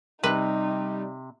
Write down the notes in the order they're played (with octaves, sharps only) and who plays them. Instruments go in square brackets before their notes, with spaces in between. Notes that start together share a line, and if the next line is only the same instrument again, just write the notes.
[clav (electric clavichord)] C3 [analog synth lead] G3 [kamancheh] D#4 [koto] B4